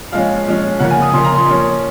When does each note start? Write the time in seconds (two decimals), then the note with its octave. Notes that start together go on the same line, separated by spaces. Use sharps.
0.12 F3 G#3 C#4 F5
0.46 F3 G#3 C#4
0.79 C#3 F3 A#3 F#5
0.90 G#5
1.02 D#6
1.13 C#3 F3 A#3 C6
1.24 A#5
1.35 C6
1.47 F3 A#3 C#4